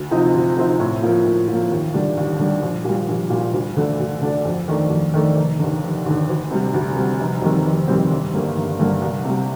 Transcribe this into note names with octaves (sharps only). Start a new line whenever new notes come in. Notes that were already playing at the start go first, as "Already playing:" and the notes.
Already playing: D2
C3 F3 C4 D#4
D2
C3 F3 C4 D#4
A2
F3 A#3
A2
F3 A#3
D#2
D3 G3 D4
D#2
D3 G3 D4
A#1
A#2 G3
A#1
A#2 G3
D2
D3 A3 D4
D2
D3 A3 D4
F2
D#3 A3 D4
F2
D#3 A3 D4
F1
D#2 D3
F1
D#2 D3
D2
C3 G3
D2
C3 G3
F1
F2 D#3 G3 C4
F1
F2 D#3 G3 C4
G1
G2 D3 G3 A#3
G1
G2 D3 G3 A#3
C2
C3 G3